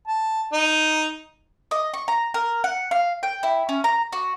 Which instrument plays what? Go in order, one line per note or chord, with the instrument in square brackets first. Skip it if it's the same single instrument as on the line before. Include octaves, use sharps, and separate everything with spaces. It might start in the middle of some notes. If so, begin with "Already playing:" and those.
[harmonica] A5
D#4
[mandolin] D#5
C#6
A#5
A#4
F#5
F5
G5
E4
C#4
A#5
F#4